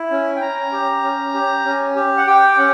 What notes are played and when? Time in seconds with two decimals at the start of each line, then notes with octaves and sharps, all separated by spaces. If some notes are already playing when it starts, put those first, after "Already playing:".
Already playing: E4
0.11 C#4
0.36 G5
0.42 C#4 A#5
0.72 G4
1.03 C#4
1.34 G4
1.65 C#4
1.96 G4
2.17 F#5
2.27 G4 G5
2.53 G5
2.57 C#4 F#5